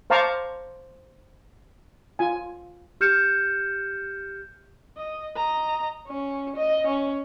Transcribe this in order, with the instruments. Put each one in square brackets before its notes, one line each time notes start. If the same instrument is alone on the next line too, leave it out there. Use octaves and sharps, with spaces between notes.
[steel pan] C5 F5 A5 A#5 C#6 D6
F4 G#5
[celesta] G4 F6 G6 C#7 E7
[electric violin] D#5
D#5 A#5
[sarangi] C#4
D#5
C#4